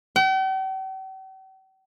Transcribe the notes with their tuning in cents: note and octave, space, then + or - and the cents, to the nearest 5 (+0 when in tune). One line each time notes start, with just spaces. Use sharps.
G5 -45